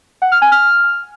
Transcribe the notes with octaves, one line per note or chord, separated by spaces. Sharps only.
F#5
F6
G#5
F6